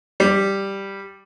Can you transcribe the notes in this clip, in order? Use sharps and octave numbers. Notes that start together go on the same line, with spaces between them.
G3